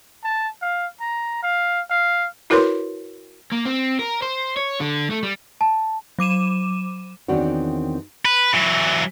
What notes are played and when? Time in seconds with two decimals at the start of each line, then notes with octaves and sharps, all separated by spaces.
0.24 A5
0.62 F5
1.00 A#5
1.43 F5
1.90 F5
2.50 E4 F#4 A#4 B4 C#5 C6
3.52 A#3
3.65 C4
3.99 A#4
4.22 C5
4.56 C#5
4.80 D3
5.11 A3
5.23 G3
5.61 A5
6.19 F#3 D6 D#7 E7
7.28 E2 D#3 C4 D4 F#4 C#5
8.25 B4
8.54 E3 F#3